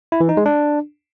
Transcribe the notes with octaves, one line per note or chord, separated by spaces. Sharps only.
E4
E3
D#4
G#3
D4